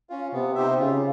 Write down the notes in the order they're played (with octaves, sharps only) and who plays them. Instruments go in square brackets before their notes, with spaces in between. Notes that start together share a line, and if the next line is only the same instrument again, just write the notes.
[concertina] C#4 F4
[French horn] C3 [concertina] B3
[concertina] D#4 G4 C5 E5
[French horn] C#3 [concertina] F4